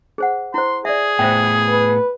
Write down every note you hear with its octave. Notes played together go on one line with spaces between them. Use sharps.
G#4 C5 F#5
E4 C5 C6
G#4 D5 E5
A2 B3 C5 E5 G5
B4